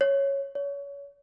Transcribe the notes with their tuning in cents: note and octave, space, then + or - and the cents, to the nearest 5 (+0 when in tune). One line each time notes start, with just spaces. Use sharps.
C#5 -5
C#5 +25